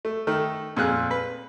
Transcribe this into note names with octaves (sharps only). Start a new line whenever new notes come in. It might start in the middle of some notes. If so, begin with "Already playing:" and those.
A3
D#3 A3
F2 A#2 G#4 F#6
B4